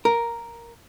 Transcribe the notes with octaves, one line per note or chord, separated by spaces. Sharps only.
A#4